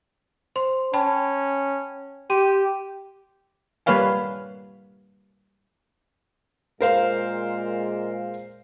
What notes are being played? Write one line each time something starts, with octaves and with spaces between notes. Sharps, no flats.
C5 C6
C#4 G5 A5 B5
G4 C6 D#7
G3 A#3 B4 C#5 F5 G#5
A#2 G#3 A#4 C5 F5